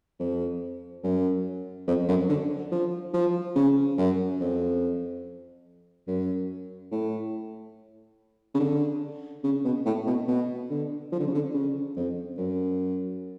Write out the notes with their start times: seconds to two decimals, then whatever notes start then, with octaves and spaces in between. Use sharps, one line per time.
0.20 F2
1.04 F#2
1.88 F2
2.09 F#2
2.29 D3
2.72 F3
3.14 F3
3.56 C#3
3.98 F#2
4.40 F2
6.08 F#2
6.92 A2
8.55 C#3
8.60 D3
9.44 C#3
9.65 B2
9.86 A2
10.07 B2
10.28 B2
10.70 D3
11.12 F3
11.20 D3
11.27 C#3
11.34 D3
11.54 C#3
11.96 F2
12.38 F#2